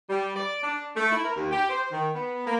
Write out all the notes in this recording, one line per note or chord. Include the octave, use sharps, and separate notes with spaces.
G3
D5
D4
A3
E4
A#4
D#2
G4
C5
D#3
B3
A#3